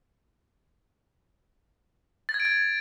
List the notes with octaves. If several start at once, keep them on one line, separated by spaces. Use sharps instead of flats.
A6
G#6
D7
G#6